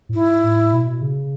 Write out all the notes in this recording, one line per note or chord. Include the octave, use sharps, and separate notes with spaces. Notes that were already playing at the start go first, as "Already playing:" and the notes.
A2
G#2 E4
A2
B2
C#3